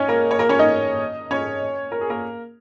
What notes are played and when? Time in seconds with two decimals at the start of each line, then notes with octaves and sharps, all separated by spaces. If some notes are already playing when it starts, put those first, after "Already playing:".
Already playing: C#4 D#4 C#5
0.08 A#3 A#4
0.31 C#5
0.39 A#3 A#4
0.49 C#4 C#5
0.59 D#4 D#5
1.31 C#4 C#5
1.92 A#4
2.01 G#4
2.10 A#3 A#4